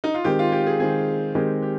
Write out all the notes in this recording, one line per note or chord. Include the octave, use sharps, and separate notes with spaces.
D#4
F4
D#3 G#3 C4 G4
F4
G4
G#4
D#3 G#3 C4 G#4
D#3 G#3 C4 G4
G4